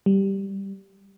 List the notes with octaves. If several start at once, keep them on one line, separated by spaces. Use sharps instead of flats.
G3